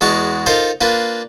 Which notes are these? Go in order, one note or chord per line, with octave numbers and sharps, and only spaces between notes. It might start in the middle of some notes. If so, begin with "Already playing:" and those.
E2 G#3 F#4 A5 A#5 C#6
D#4 F4 A4 A#4 C5 F5
A#3 D4 F4 B4